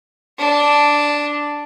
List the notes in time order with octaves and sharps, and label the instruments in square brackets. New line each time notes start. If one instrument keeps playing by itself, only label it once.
[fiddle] D4